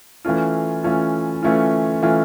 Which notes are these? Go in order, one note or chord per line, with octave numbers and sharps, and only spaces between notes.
E3 A3 C#4 F4
E3 A3 C#4 F4
E3 A3 C#4 F4
E3 A3 C#4 F4